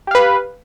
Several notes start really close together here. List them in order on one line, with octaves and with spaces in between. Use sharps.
G4 F5 B4